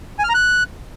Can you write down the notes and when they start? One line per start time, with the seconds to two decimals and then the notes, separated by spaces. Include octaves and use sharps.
0.19 G#5
0.24 F6
0.29 A#5
0.34 F#6